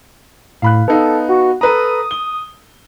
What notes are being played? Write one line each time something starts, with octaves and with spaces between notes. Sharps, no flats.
A2 F5 B5 F#6
B3 D#4 A4 F5
F#4
A4 B4 A#5 D#6
G7